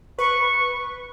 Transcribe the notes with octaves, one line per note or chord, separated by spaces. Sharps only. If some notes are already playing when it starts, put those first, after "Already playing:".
B4 C#6